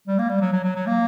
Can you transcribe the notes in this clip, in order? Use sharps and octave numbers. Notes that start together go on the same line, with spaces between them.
G3
A#3
G3
F#3
F#3
F#3
F#3
A#3